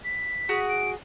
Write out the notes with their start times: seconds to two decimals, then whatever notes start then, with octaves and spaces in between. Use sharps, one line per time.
0.04 B6
0.49 F#4 G#4
0.69 D7